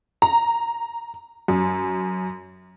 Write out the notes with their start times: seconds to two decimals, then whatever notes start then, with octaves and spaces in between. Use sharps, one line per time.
0.22 A#5
1.48 F#2